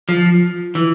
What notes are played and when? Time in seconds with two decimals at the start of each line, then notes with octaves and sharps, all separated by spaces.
0.09 F3
0.75 E3